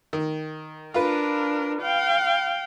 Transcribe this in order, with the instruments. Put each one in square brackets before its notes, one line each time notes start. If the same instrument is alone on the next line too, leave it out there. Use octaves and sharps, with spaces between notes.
[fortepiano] D#3
[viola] D4 A#4 [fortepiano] F4 B4
[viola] F5 G5